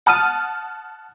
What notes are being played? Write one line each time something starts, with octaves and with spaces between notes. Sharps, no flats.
F#5 A5 D#6 F6 D#7